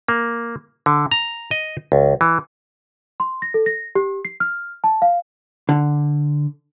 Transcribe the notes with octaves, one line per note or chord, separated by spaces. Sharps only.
A#3
D3
A#5
D#5
C#2
E3
C6
A#6
A4
A#6
G4
C7
F6
A5
F5
D3